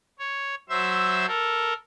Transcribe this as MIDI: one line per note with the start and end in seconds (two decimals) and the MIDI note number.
0.19 0.55 73
0.69 1.26 54
0.69 1.26 72
0.69 1.26 76
0.69 1.26 88
1.27 1.74 69
1.27 1.74 70